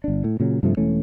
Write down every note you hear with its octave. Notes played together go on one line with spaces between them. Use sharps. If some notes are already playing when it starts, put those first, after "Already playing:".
G1 D4
A2
A#2 C#3 F#3
G2 C3 F3 A3
E1 E3 A3 C#4